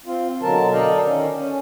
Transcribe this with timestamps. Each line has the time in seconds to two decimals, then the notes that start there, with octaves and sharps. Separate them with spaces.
0.06 C4 F4
0.42 B2 D3 F#3 A#4 A5
0.73 A4 A#4 D5 D#5 F5 G5
1.03 D#3 C#4
1.33 C#4